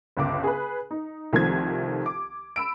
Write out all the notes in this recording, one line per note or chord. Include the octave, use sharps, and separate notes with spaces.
G1 C#2 D6
G#4 B4
D#4
C2 D#3 F3 A3 C4 G#6
D6
B5 E6 D7